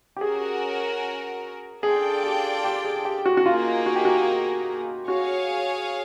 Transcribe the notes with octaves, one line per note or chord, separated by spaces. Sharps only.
G4
C#4 F#4 G#4 A#4
D4 F4 G#4 A4 D5 G5
G4
G4
G#4
G4
F#4
F#4
A#3 D#4 F4 G#4
F#4
G4
F#4
F#4 G#4 C#5 F5